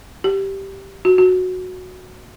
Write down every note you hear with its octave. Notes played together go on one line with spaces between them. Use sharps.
G4
F#4
F#4